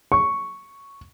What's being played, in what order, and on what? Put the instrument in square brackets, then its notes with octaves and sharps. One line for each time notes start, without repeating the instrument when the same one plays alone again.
[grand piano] C#6